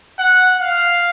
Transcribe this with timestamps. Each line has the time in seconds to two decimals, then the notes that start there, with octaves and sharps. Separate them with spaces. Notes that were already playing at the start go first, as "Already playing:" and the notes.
0.19 F#5
0.60 F5